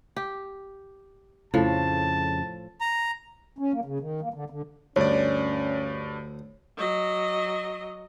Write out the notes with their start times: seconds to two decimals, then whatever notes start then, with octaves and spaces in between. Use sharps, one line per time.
0.16 G4
1.54 F2 A2 C#3 F3 A5
2.81 A#5
3.59 C#4
3.73 A#3
3.85 C#3
4.00 D#3
4.21 A#3
4.34 D3
4.50 D3
4.96 D2 G2 C#4 C#5 D5
6.78 F#3 D#5